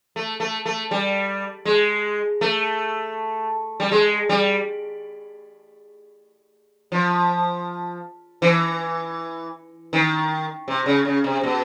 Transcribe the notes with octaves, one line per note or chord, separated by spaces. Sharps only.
A3
A3
A3
G3
G#3
A3
G3
G#3
G3
F3
E3
D#3
C3
C#3
C#3
C3
B2